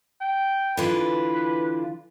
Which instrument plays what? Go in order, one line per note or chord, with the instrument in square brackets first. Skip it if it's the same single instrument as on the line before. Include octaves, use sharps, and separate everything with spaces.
[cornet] G5
[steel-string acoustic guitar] D3 E3 F4 [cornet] B4